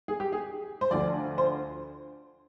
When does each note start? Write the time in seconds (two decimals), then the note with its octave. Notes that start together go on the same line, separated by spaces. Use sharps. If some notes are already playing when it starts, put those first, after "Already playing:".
0.08 G#4
0.20 G4
0.32 G#4
0.81 C5
0.91 D2 D3 F3 D5
1.38 C5